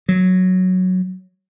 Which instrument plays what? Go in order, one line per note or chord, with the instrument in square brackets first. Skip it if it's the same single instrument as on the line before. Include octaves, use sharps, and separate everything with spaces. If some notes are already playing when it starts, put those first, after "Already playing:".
[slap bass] F#3